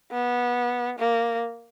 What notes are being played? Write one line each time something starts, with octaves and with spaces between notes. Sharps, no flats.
B3
A#3